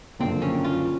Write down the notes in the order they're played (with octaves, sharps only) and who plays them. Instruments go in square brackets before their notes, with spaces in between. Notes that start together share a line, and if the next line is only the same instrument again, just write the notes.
[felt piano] F#1 F#2 D3 F3 A#3 [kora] C4
[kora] C#4
F4